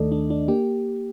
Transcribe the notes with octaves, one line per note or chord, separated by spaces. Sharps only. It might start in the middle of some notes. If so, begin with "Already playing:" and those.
Already playing: D#2 D#3 A3 D4 A4 D5 D#5
D4
D4
A#3 G4